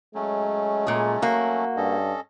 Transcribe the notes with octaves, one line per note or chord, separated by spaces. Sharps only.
F#3 G#3 A3 C#4
A#2 G#4
A#3 F#4
G2 C#4 A4 D#5